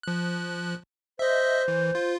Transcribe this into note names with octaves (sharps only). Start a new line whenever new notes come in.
F3 F#6
C5 D#5 E5
E3
F4